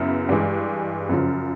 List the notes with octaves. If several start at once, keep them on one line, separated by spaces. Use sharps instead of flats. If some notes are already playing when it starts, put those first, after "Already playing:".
Already playing: F#2 C#3 B3 E4
G2 E3 G#3
F#2 C#3 F3